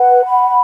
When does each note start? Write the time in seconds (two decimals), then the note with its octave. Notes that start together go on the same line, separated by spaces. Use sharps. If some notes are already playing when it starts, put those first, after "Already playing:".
Already playing: B4 F#5
0.24 B5